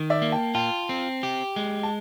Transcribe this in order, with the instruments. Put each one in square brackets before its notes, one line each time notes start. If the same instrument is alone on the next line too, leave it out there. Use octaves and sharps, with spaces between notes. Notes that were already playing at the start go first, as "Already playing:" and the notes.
Already playing: [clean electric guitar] D#3
[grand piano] D5 E5
[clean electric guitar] A#3
[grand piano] G5 A5
[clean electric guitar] F4 [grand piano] G5 A5
[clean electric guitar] C4
G4
G#3
[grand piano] A5